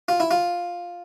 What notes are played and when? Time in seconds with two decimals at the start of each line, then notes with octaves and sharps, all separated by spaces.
0.08 F4
0.20 E4
0.31 F4